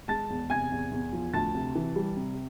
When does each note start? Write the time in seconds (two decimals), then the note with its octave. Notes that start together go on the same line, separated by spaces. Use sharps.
0.08 G#3 A5 A6
0.30 E2
0.50 C3 G#5 G#6
0.72 E2
0.91 E2
1.13 F3
1.33 D2 A5 A6
1.55 C3
1.75 E3
1.96 G3
2.17 C3